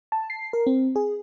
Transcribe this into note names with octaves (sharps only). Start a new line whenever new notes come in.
A5
C7
A#4
C4
G#4